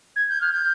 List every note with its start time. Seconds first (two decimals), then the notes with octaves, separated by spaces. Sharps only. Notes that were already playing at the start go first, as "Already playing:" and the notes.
0.16 G#6
0.29 G6
0.40 F6
0.52 G6